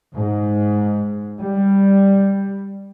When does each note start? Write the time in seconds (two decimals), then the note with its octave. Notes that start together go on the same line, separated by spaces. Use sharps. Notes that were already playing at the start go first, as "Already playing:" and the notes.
0.15 G#2
1.42 G3